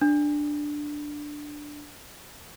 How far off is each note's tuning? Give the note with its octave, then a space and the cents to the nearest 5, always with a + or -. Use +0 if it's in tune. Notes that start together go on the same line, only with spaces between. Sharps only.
D4 +5